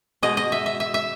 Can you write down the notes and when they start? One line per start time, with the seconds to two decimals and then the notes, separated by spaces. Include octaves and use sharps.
0.23 B2 G#3 D#5
0.37 D#5
0.52 E5
0.66 E5
0.80 E5
0.94 E5